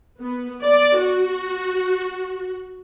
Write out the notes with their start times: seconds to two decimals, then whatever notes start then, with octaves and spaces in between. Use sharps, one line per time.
0.20 B3
0.63 D5
0.98 F#4